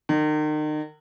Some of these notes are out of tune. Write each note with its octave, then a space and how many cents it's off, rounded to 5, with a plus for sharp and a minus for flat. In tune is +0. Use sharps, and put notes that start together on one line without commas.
D#3 -35